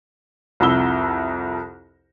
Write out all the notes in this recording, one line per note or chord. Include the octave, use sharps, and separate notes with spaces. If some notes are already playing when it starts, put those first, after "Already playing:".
C2 F2 E4 B5 E6 G7